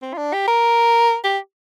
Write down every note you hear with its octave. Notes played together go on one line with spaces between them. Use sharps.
C4
F4
D4
G4
A#4
G4